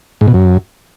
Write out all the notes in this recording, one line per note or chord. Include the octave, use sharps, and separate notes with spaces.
G#2
B2
F#2